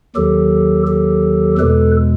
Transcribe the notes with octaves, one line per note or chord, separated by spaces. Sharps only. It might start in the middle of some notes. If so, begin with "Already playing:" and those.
D#2 D#3 F#3 G4 A4
G4 A4
E2 B2 G#3 A4 B4